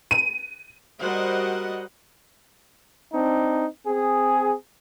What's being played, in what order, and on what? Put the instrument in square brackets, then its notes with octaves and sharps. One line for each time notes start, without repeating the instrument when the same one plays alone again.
[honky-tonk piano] D#7
[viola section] G3 F#4 A#4 C5 D#5 F#5
[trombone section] C4 D4 D#4
C4 G#4